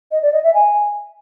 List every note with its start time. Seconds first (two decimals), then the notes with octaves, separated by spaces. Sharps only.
0.11 D#5
0.22 D5
0.33 D#5
0.43 E5
0.54 G#5